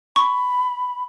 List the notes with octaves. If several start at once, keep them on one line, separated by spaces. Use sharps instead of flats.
B5 C#6